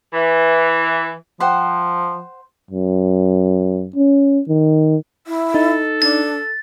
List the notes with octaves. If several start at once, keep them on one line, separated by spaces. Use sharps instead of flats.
E3
F3 C5 F#5 G5
F#2
C#4
D#3
E4
D#4 A4
D4 A6